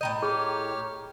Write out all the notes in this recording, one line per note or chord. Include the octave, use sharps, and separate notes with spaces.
A2 E3 D#5 G5 A#5 G6
G4 G#4 C#5 F6